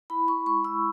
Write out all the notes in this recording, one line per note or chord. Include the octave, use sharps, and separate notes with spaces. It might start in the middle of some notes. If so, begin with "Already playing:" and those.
E4 B5
E4 C#6
G#3 C#6
G#3 E6